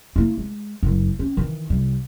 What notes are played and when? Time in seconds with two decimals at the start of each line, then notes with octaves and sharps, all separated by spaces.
0.16 A#3 E4
0.38 G#3
0.83 F#1 F#2
1.19 C#4
1.37 D#3 E3
1.70 C2 G3